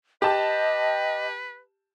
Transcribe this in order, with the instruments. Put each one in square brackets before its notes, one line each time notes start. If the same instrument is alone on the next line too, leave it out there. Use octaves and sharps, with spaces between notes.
[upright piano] G4 A5 [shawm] B4 [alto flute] D#5